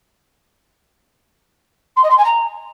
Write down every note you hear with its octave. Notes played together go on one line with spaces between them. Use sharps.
C6
D#5
C6
G#5
A#5